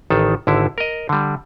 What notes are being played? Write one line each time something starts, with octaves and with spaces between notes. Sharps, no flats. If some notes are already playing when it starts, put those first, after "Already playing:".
A1 D#3 A4
G#1 D3 E4
A#4 D#5
D3 G3